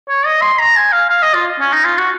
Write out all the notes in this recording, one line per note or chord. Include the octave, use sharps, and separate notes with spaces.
C#5
D#5
C6
A#5
G#5
F5
F5
D#5
F4
C#4
D#4
F4
F#4